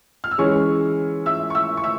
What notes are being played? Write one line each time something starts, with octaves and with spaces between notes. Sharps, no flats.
F6
E6
E3 G#3 C#4 C#5 C#6
E5 E6
C#6
E5 E6
C#6
E5 E6